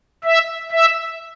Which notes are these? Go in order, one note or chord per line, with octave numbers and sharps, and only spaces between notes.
E5
E5